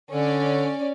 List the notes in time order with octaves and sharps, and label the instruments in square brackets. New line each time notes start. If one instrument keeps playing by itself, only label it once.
[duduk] D3 [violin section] C#4 D5